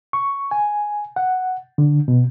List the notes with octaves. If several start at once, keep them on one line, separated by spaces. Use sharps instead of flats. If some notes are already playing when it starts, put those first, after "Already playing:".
C#6
G#5
F#5
D3
B2